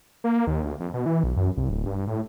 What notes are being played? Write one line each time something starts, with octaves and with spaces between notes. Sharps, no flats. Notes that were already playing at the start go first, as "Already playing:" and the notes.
A#3
D#2
D2
F2
B2
E3
B1
F#2
C2
D1
G2
A2